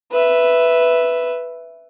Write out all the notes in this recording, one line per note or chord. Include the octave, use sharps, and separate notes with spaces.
B4 E5